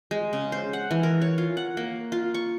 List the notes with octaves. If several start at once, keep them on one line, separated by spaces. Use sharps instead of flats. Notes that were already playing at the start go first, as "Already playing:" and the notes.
G#3
C#3
C5
F#5
E3
A#4
C#5
F4
F#5
A#3
F4
C#6